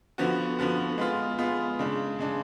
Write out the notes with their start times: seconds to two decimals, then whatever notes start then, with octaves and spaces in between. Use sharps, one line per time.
0.18 D3 F3 B3 F#4
0.59 D3 F3 B3 F#4
0.98 G#3 B3 F4
1.38 G#3 B3 F4
1.79 C#3 G#3 D4
2.19 C#3 G#3 D4